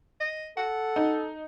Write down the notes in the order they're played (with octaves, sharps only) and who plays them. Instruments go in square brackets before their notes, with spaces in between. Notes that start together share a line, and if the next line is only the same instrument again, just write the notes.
[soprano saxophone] D#5
[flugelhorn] A4 [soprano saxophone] F#5
[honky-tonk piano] D#4